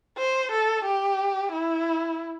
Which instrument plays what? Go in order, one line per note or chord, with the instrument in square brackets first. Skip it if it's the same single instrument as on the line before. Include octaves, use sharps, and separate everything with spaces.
[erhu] C5
A4
G4
E4